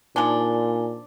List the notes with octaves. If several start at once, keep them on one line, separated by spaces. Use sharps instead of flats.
A#2 F3 D4 D#4 G#5 G7